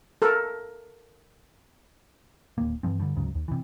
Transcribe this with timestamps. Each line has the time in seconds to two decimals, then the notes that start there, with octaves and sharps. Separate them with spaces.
0.22 A4 A#4
2.58 D1 D#2 A#3
2.83 G2 E3 F3 C4
3.00 G2 D3
3.16 D2 G#2 C#3 F#3
3.35 D#2
3.48 C3 E3